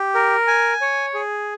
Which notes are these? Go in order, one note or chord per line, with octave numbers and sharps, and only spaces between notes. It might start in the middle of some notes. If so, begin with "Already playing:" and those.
Already playing: G4
A#4
G#5
C#5
G#4